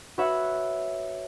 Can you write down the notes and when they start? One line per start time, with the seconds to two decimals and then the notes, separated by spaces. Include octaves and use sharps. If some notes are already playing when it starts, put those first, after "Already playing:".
0.18 F#4 B4 C#5 E5 F#5